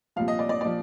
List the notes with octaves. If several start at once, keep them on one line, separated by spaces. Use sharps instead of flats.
C2 A#2 F3 F5
D#5
D5
D5
A#2 F3 D5